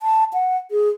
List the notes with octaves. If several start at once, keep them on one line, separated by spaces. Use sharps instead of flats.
A5
F#5
G#4